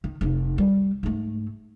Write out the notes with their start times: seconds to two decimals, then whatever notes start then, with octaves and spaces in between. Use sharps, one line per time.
0.04 D#3
0.21 F1 D#4
0.58 G3
1.03 G#2 A3